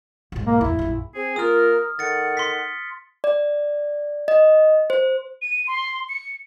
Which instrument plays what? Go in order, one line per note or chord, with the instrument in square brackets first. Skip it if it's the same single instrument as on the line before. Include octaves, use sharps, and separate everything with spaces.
[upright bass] B1 G#2
[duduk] A#3
[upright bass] E2 A2 [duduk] E4
[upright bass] A#1 F#2
[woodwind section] C4 G#4
[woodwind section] A#3 F4 A#4 [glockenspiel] D#6 F6
[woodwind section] D#3 A4 F#5 [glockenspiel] A6 C#7
[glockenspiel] C6 B6
[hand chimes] D5
D#5
C5
[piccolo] D#7
C6
C#7